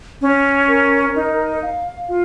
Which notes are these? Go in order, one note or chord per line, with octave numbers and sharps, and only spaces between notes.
C#4
A#4
D#4
F5
F4